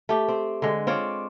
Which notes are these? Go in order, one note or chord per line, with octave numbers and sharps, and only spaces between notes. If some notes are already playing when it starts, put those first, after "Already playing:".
A3 G4
C4
D3 G#3
C4 F4 C#5 D5